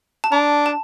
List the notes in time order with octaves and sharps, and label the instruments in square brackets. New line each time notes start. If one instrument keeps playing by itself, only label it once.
[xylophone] A5
[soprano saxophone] D4 [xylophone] A#5
[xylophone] A5